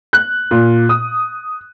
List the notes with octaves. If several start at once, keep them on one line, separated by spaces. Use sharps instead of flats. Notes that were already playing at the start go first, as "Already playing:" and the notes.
F#6
A#2
D#6